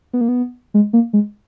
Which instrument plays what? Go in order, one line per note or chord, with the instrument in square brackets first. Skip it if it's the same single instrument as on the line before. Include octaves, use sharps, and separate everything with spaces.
[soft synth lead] B3
A#3
B3
G#3
A#3
G#3